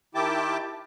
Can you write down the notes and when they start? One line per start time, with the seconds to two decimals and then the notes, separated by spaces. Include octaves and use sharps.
0.15 D#3 E4 G4 G5 A5 D6